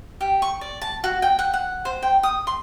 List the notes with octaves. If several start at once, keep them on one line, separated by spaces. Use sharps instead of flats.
G4
C#6
D5
A5
F#4
G5
F#5
F#5
C5
G5
D#6
C6